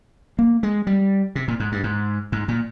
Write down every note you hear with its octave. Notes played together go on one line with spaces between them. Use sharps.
A#3
G#3
G3
C3
A#2
G#2
G2
G#2
G#2
A#2